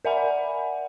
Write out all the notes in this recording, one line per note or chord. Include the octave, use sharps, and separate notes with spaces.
A#4 D5 E5 F#5 G#5 B5